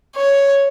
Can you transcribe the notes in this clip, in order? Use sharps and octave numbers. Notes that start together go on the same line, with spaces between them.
C#5